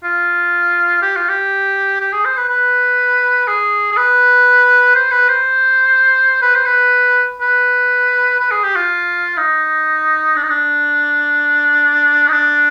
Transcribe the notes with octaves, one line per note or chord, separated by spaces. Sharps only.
F4
G4
F4
G4
G4
G#4
C5
B4
B4
G#4
G#4
B4
C5
B4
C5
B4
C5
B4
B4
B4
G#4
G4
F4
D#4
D4
D#4
D4
D#4
D4